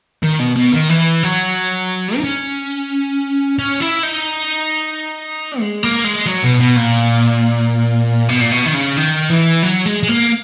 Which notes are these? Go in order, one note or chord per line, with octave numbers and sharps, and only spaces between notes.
D#3
B2
B2
D#3
E3
F#3
D#4
C#4
C#4
E4
D#4
G#3
A#3
G#3
F#3
B2
B2
A#2
B2
A#2
B2
D#3
C#3
D#3
E3
F#3
G#3
G#3
A#3